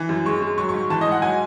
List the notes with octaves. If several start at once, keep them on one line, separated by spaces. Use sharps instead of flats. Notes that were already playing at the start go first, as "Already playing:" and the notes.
Already playing: E3
F#2
G#3 C#6
G#3
F#3 C#6
C#6
G#2
E3 A5
D#5
G#2 F#5
F#3 G#5